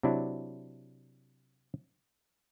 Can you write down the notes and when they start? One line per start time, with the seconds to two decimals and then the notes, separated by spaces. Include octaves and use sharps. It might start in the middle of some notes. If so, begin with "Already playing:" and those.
0.03 C3 F#3 D4 E4